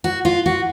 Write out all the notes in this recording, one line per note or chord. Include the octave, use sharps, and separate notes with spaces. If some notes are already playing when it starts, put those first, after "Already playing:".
F#4
F4
F#4